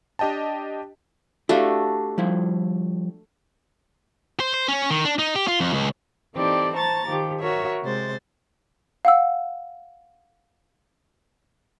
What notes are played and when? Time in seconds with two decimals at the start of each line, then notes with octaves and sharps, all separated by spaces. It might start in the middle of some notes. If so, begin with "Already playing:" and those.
0.19 D4 G4 D#5 G5 A5
1.49 A3 D4 E4 F#4 G4 F5
2.18 F3 G3 E4
4.40 C5
4.54 C5
4.68 C#4
4.90 D#3
5.05 D4
5.19 D#4
5.36 G4
5.47 F4
5.60 F2
5.73 C#2
6.35 E3 C4 D#4 G4 A4 D5
6.74 C5 A5 A#5 C#6 A6
7.08 D#3 F3 G4
7.41 F#4 A#4 C#5 E5
7.83 C3 G#3 C5 A6
9.05 F5 F#5 E6